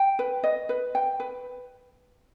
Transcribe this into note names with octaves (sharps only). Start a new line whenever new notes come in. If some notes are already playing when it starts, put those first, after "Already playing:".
Already playing: G5
B4
D#5
B4
G5
B4